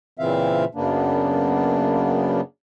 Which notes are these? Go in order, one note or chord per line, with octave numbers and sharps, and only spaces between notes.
A#2 C#3 E3 C4 E5 F5
F#2 C#3 A#3 B3 D4